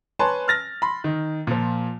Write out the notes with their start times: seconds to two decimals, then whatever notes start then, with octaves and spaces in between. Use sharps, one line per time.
0.19 B4 C#5 G#5 A5 C6
0.48 F6 A6 A#6
0.82 B5 C6
1.04 D#3
1.47 A#2 F3